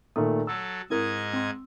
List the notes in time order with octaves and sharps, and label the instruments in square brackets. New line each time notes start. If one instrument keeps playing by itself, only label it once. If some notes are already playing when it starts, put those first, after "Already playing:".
[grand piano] A#2 D#3 A3 [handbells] D#6
[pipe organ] F#3 A4 [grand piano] E6
[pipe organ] G#2 D#5 G#6 [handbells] C4 E4 A#4
[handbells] C4 C6